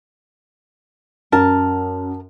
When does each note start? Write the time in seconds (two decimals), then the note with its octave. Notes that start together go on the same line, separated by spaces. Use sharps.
1.32 F#2 A#4 A5